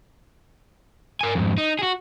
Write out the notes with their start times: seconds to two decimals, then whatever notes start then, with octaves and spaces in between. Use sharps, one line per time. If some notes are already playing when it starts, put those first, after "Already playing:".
1.21 A#4 G#5
1.35 F2 G#2
1.58 D#4
1.79 F#4 G#4